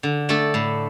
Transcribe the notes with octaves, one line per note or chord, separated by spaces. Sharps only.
D3
A3 D4 A4
A2